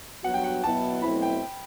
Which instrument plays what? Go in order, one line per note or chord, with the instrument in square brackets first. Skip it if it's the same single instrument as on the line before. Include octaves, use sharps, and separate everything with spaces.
[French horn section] G2 F#3 B3 F#4 [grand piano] F#5
[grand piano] G5
F#5
[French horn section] B2 F#3 B3 E4 [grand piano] A5
[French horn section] B2 F#3 A3 C4 E4 [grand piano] B5
[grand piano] G5